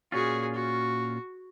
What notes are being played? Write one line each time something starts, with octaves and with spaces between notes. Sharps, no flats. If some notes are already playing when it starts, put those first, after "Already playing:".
A#2 C#4 F4 F#4 G#4
F#4